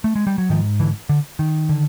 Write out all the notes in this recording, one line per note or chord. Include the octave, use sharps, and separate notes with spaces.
A3
G#3
G3
F#3
G#2 D#3 F3
D3 E3
D3
D#3
D3